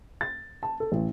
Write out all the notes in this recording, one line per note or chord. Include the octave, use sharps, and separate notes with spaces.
A6
A5
A4
A1